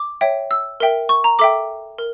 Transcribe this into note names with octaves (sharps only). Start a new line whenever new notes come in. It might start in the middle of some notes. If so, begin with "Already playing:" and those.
Already playing: D6
C#5 E5 G5
E6
A#4 E5 G5
C#6
A#5
A4 E5 G5 D6
A#4